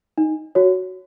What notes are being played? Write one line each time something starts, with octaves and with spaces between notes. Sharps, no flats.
D#4
F#4 C#5